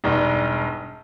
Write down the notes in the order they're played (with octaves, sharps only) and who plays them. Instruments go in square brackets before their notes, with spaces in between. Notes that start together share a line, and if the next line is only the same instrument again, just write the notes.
[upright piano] E1 G2 D4 D#4